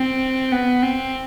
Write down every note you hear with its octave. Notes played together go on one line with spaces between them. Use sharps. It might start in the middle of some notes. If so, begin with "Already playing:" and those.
Already playing: C4
B3
C4